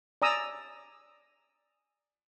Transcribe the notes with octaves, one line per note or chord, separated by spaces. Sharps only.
D5 G#5 A#5 D#6 E6